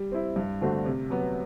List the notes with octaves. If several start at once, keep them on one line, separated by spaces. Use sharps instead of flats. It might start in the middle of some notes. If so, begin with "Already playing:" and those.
Already playing: G3
C4 E4
G2
D3 A3 C4 F#4
C3
F#3 B3